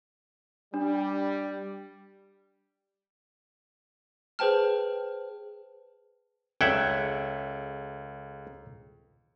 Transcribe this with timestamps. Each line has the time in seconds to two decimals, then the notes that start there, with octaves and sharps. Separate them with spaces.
0.74 G3 D4
4.39 G#4 B4 C5 G5 A5 F6
6.61 C#2 G#4 A4 C#5 E5 F#5 G5 G#6